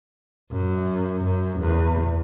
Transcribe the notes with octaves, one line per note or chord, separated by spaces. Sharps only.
F#2
F#2
E2